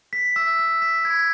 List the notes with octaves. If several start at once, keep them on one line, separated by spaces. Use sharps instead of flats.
B6
E6
E6
B6
G#6